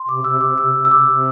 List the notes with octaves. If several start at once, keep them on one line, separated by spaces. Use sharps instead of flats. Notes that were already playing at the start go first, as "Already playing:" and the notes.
Already playing: C6
C3 D6
C3 E6
C3 D6
C3 E6
C3
E6
C3 D6
C3